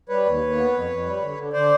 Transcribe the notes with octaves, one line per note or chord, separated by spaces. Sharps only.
G3 B4 C#5
D#2
D#2
B3
F2
F2
G3
D3
D3
D3 C5 D5